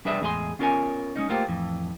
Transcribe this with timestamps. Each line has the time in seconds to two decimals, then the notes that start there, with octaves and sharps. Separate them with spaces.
0.05 G3 D4 G#4 B4 D5 E5
0.22 E2 A2 G#3 G#4 B4 C6
0.59 B3 C#4 F4 A#4 C#5 G#5
1.16 G#3 C#4 D#4
1.29 A3 A#3 F4 G4 A#4 C5
1.48 F2 A2 E3